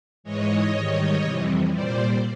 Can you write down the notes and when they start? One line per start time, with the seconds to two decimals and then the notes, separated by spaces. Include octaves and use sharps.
0.24 G#2 E3 G#3 C#5 D#5
0.73 G#2 D#3 G3
1.22 F2 C3 E3 G3
1.72 A#2 G3 C5 D5